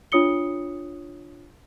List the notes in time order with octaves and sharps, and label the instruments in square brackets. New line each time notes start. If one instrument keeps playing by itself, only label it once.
[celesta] D4 F4 C#5 D#6 C#7 G7